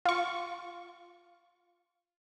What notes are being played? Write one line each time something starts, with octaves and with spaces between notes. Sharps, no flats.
F4 C#6